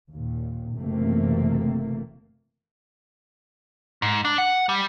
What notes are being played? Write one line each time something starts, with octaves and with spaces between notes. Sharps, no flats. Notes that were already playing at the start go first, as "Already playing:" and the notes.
D#2 A#2
F#1 C3 E3 A3 A#3 C4
G#2
D4
F#5
G3